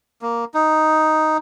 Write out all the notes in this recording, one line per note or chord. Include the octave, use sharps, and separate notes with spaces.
A#3
D#4